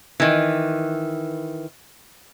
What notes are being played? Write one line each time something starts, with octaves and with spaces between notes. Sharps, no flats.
D#3 E3